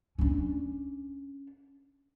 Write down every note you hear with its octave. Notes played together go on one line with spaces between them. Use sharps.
C#4 D4